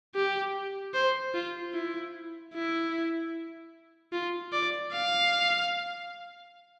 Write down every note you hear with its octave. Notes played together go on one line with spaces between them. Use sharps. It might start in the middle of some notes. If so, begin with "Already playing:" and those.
G4
C5
F4
E4
E4
F4
D5
F5